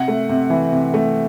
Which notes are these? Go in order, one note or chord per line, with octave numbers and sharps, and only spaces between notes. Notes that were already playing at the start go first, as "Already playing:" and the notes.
Already playing: C3 F#5
A3
C3
E3
C3
A3